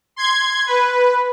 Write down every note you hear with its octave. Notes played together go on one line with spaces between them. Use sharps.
C6 G#6
B4